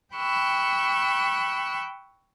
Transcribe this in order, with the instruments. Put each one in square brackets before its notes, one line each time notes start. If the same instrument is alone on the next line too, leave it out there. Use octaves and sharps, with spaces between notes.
[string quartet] G5 B5 C#6 E6 F#6